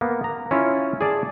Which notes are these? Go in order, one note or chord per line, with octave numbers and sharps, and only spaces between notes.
A#3 B3
A#5
C#4 E4 F4
G#4 D5 A5